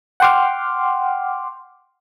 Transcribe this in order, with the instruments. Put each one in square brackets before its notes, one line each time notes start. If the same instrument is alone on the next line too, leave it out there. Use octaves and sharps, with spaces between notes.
[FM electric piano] F#5 G5 C6 D6 F6